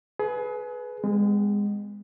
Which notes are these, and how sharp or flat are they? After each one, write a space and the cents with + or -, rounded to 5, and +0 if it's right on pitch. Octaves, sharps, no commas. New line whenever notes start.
G#4 +30 B4 +0
G#3 -25 B3 +35